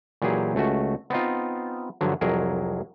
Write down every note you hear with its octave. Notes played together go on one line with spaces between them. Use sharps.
A#2 E3 F#3 G4 G#4
C#2 A3 F#4
B3 C4 D#4 F4
G2 D3 F3 F#3
C2 F2 F#3 G#4 A#4